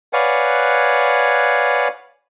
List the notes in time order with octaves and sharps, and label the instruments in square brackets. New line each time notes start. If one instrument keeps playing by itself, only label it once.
[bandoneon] B4 C#5 D5 F5 F#5 G#5